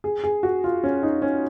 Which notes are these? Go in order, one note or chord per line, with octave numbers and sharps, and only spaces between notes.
G#4
G#4
F#4
F4
C#4
D#4
C#4